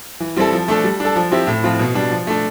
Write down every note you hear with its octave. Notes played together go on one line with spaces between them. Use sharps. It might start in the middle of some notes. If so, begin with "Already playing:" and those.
E3
G3 C4 E4 A4
F3
A3 D4 A4
G3
D4 A4
F3
C4 E4 G4
A2
F3 C4 F4
B2
G3 D4
F3
A3 D4